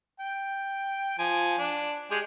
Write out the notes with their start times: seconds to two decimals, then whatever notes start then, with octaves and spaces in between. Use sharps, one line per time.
0.20 G5
1.19 F3 G#5
1.59 D4
2.11 G#3 G4 G#4